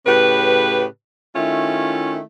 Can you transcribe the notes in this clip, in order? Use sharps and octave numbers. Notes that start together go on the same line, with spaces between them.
A2 C#3 G4 B4
D#3 A3 C#4 E4 F4